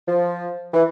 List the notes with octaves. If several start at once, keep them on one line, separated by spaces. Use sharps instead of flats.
F3
E3